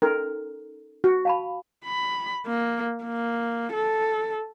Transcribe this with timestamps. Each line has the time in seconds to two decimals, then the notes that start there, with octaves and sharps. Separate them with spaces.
0.02 C#4 D#4 A4 A#4
1.04 F#4
1.25 F5 A5 B5
1.85 B5
2.46 A#3
3.03 A#3
3.73 A4